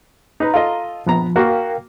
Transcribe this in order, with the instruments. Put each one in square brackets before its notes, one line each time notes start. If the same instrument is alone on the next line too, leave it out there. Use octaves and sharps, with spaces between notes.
[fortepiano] D#4 B4 [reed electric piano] A#5
[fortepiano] F4 A4 D#5
[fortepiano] A#1 B3 A#5 [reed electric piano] F3
[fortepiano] A#3 F#4 [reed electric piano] A#4 F5 G5